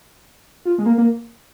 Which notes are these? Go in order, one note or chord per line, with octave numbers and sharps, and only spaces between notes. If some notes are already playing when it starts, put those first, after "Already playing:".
F4
G#3
A#3
A#3